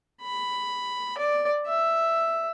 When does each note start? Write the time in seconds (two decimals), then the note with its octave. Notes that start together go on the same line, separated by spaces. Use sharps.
0.22 B5
1.18 D5
1.66 E5